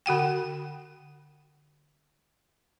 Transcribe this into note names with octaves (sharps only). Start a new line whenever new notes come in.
D3 F#4 F#5 G5